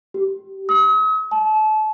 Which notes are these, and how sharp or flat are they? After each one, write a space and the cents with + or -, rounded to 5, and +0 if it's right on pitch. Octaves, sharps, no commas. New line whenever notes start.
G4 -20
D#6 +45
A5 -30